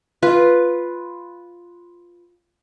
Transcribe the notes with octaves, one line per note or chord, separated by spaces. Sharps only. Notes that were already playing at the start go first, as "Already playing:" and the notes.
F4 B4